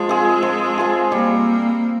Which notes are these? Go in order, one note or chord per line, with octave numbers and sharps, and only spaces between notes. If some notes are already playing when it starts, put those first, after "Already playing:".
Already playing: F3 G#3
C4 F4 G#4
F3
C4 F4 G#4
G3 A#3